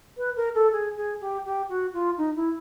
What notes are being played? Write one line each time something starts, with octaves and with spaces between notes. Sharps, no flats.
B4
A#4
A4
G#4
G#4
G4
G4
F#4
F4
D#4
E4